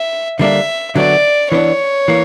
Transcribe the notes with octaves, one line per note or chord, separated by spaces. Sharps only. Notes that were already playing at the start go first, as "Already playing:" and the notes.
Already playing: E5
D3 G3 A#3 D4 E5
D3 F#3 B3 F#4 D5
E3 B3 D4 C#5
E3 A#3